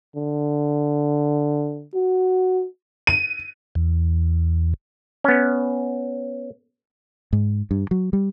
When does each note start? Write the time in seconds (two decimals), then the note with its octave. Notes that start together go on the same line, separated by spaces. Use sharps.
0.16 D3
1.94 F#4
3.07 D#7
3.75 E2
5.24 B3 C#4
7.33 G#2
7.71 G2
7.91 F#3
8.13 G3